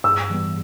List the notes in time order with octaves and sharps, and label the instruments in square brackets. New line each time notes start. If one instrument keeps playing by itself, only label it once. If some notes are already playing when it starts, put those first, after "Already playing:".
[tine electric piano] G2 [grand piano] E6
[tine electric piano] E3 G3 B3